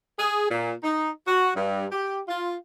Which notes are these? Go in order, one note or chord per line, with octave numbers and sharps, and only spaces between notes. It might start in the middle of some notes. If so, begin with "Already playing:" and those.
G#4
A#2
D#4
F#4
G2
G4
F4